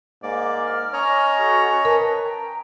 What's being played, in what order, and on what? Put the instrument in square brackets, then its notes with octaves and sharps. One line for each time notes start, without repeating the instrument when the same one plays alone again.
[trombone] G#2 [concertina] A#3 D5
[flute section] F6
[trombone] C#4 [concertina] C#5 D#5 A#5
[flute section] F#4 A4
[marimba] A#4 [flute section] B4 G#5 A5
[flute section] G5 A#5